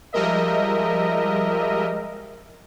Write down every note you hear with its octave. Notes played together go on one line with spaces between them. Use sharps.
F3 G3 G#3 A#4 D#5 E5